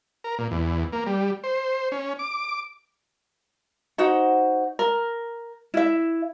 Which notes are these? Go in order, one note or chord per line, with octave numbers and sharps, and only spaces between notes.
A#4
A#2
E2
A#3
G3
C5
C#4
D6
D#4 F#4 C5 F#5
A#4
E4 E5